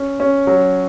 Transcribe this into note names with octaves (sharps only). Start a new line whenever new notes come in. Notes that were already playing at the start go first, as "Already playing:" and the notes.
Already playing: C#4
C#4
F#3